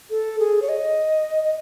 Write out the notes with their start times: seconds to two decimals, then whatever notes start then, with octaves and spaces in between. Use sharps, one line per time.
0.10 A4
0.40 G#4
0.62 C#5
0.69 D#5
1.44 D#5